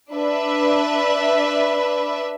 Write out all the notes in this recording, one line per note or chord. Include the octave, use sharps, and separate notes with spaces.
D4 B4 E5